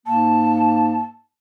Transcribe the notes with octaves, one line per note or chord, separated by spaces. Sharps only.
G#2 A#3 A5